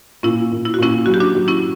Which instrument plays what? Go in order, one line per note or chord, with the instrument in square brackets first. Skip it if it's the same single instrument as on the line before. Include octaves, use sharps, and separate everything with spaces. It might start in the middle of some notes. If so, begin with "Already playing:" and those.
[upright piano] A#2 [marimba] C#4 E4
[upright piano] A#2
[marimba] E4
F#4
[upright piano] A#2 [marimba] C#4 E4
[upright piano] F#3 [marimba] F#4
[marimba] G4
D4 F#4
[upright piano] F#3
[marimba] C#4 E4